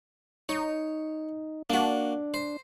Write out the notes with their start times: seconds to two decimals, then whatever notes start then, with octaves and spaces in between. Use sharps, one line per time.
0.49 D#4 C#5
1.70 A#3 D4 F#4
2.34 C5